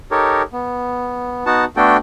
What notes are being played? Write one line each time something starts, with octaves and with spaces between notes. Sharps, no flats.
D#4 G4 A4 A#4 C#5
B3
B3 D#4 F#4 F#5 A5
A3 B3 D4 F#4 A4 G5